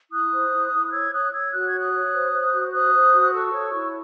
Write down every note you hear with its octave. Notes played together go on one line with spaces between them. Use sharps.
E4 D#6 F#6
C5
E4
E4
F#6
C#5 E6 G#6
C#5 D#6 F#6
C#5 E6 G#6
F#4 F#6
G#6
C#5
D#6 F#6
C#5
C5
C5
F#4
C5 D#6 F#6
C5
F#4
F#6
A4 C#6 E6
C#5
E4